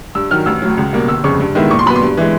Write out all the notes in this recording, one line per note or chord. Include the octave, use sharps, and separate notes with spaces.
G2 E6
D#3 F#3 F6
A1 E6
A2 F#3
C#2
B2 G3 A#3
G1 E6
F2 C#3 C#6
G2
D#3 G#3 B3 E4
A#2 C#6
C6
F#3 B3 B5
C6
G2
E3 G#3